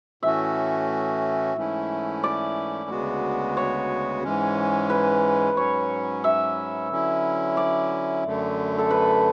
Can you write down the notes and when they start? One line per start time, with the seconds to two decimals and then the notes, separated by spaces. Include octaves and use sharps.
0.23 A2 E3 A3 C#4 F#4 E5
1.56 G#2 E3 A3 C#4 E4
2.24 D5
2.90 D2 C#3 G#3 B3 F#4
3.57 C#5
4.24 G#2 E3 G#3 C#4
4.90 B4
5.57 G#2 F#3 C#4 C#5
6.24 E5
6.91 D3 F#3 C#4 E4
7.57 D5
8.24 F#2 D3 A3
8.78 A4
8.90 B4